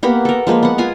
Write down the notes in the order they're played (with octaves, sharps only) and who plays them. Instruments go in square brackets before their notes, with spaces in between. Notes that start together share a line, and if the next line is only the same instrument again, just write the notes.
[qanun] A#3 B3 G4 B5
A4 A#4
F3 G#3 A#3 B4
B3 F#5
F4 G#5 A#5